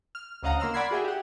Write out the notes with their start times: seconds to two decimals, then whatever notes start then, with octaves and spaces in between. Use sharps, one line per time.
0.15 F6
0.43 D2 C#3 D#5 F5 F#5 A#5
0.60 A#3 C6 E6 F6
0.74 D5 F#5 B5 G#6 C7
0.91 F#4 G#4 E5 G5
1.04 G4 F#5